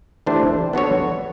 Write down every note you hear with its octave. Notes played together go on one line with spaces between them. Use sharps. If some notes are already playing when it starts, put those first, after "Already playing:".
E3 A3 D4 G4 C5
B3 D4 F#4 A4 C#5